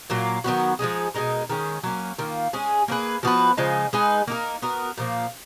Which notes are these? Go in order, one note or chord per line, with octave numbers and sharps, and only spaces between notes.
A#2 F#3 A#3
D#3 F#3 B3 F#4
F3 G#3 D#4 G#4
B2 G#3 D#4 A#4
D#3 G#3 C#4
F#3 A#3 C#4
D#3 A#3 F4
G#3 C#4 G#4
A#3 C#4 G#4 B4
F3 B3 F#4 B4
C#3 F3 G#3 D#4
G#3 D#4 G#4 B4
A#3 D#4 A#4
B3 F#4 A#4
A#2 F3 A#3